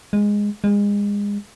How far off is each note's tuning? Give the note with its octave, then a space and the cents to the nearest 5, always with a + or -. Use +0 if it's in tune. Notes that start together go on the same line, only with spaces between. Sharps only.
G#3 -10
G#3 -30